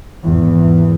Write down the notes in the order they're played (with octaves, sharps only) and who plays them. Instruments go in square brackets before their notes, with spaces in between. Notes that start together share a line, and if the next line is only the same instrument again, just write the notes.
[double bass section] G#1 E2